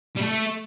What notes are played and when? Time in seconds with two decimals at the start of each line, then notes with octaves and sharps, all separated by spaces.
0.16 G3
0.21 A3